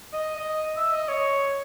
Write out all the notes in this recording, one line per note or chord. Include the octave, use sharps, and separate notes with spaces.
D#5
D#5
E5
D#5
C#5